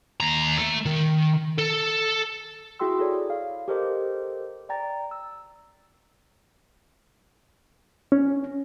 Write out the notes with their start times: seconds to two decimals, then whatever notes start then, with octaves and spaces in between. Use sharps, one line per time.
0.20 D#2 A#5
0.58 A3
0.86 D#3
1.58 A4
2.79 E4 F#4 G#4 G5 C6 E6
2.98 E4 G#4 A4 C#5 D5
3.30 F5
3.68 G4 A4 A#4 C5 D#5 D6
4.69 D5 G5 A#5 A6
5.11 E6
8.12 C#4